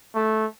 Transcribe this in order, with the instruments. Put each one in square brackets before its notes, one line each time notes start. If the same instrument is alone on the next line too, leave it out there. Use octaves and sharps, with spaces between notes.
[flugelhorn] A3